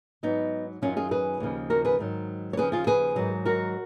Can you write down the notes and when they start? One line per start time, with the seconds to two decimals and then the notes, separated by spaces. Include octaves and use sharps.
0.23 G#2 F#3 B3 D#4
0.82 F#2 D#3 F#3 C#4 F4
0.97 F4 G#4
1.11 G#4 B4
1.40 D#2 C#3 F3
1.70 F#4 A#4
1.85 G#4 B4
1.99 G#2 D#3 F#3
2.53 C#5
2.57 D#2 C#3 F3 G#4 B4
2.72 F4 G#4
2.87 G#4 B4
3.16 G#2 D#3 F#3
3.45 F#4 A#4